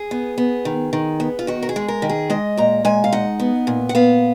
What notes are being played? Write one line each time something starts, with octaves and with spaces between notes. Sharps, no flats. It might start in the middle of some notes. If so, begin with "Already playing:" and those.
Already playing: G#4
B3
B3
D#3
D#3
B3
F4
D#3 F#4
A#4
G#4
G#3
A#4
D#3
G#4
G#3 D#5
A#2 A#5
G#3 G#5
F5
D#4 F#5
B3
A#2
F#5
B3 F5